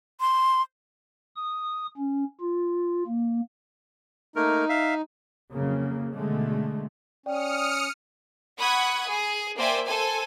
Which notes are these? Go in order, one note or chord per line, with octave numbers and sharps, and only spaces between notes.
C6
D#6
C#4
F4
A#3
A3 A#3 D#4 A#4
E5 F5
F2 C#3 F#3 A#3
B2 D3 G#3 A3
C#4 D5 G5 D#6 F6 C#7
F#5 B5 C#6 D#6 F#6 G#6
G#4
A#3 C5 D5 E5 G5 G#5
A4 C5 G#5